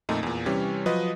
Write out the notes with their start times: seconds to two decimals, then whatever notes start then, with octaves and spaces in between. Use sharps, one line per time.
0.09 F2 A#2 A3 D#4
0.23 E2 A#2
0.46 C3 E3 G3 C#4
0.86 F3 F#3 B4 D#5 D#6